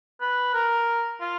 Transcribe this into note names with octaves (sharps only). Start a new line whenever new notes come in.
B4
A#4
F4